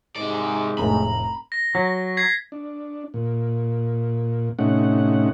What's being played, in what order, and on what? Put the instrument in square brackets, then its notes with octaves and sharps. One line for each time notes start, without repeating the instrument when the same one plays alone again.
[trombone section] G#2 [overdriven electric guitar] C3 D5
[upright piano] F1 A2 [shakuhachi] A#5 [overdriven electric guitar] B5
[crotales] A#6
[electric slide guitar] F#3
[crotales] G#6 B6 C7
[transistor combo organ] D4
A#2
A2 C3 A3 C#4 D#4 F#5